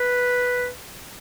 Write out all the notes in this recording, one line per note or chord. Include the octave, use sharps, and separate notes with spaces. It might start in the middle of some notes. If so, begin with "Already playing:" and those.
Already playing: B4